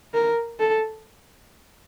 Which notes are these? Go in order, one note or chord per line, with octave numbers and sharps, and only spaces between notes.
A#4
A4